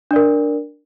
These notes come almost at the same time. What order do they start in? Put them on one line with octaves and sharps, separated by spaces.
D4 D5 A#4